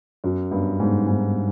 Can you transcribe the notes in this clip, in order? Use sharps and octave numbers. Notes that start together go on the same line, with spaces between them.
F#2
G2
G#2
G#2